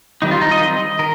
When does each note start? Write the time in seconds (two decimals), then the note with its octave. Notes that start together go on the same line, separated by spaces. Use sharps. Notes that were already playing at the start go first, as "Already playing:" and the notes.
0.22 D#3 G3 C4 D#4
0.31 F4
0.41 D#4
0.51 D#5
0.60 D#3 G3 C4
0.99 D#3 A#4